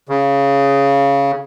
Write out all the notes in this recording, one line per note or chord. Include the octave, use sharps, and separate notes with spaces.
C#3